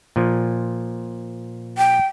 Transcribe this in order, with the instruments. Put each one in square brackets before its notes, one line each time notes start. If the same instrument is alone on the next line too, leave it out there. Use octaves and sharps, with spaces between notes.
[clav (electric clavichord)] A#2 F3
[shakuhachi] G5